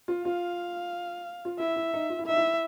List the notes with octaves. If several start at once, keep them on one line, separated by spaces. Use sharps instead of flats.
F4
F4 F5
F4
E4 E5
E4
D#4
F4
E4
D#4 E5
E4